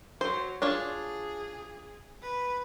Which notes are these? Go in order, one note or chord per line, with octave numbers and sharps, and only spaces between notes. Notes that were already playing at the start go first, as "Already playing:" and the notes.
F#3 C5
D4 F4 G#4 C#5
B4